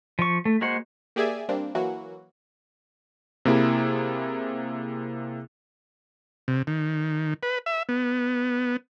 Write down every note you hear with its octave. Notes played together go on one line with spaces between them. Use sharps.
F3 C#6
A3
G#3 A#3 F#4 C5 F#5
A#3 G4 G#4 D5 E5 G#5
G3 A#3 C4 D4
E3 F#3 A#3 F#4
C3 A#3 E4 G#4
C3
D#3
B4
E5
B3